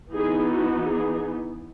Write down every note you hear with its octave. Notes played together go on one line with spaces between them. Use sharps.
E3 B3 D#4 G#4
F#4
G#4